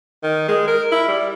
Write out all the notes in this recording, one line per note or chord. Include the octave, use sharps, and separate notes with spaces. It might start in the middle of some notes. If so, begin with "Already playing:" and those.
D#3
G#3
A#4
E4
G3